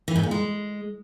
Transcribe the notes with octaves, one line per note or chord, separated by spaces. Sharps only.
E3
G#2
A#2
G#3